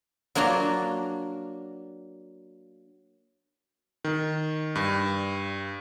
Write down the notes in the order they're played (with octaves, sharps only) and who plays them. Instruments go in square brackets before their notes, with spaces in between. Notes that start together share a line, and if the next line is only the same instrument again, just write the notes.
[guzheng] F#3 A#3 D4 F4 F#4
[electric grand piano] D#3
G2